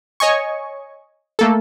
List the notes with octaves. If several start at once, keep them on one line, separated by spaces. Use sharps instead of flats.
C#5 D#5 G#5 C#6
A3 A#3 A4